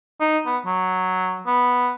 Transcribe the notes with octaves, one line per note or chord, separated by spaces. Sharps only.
D#4
B3
F#3
B3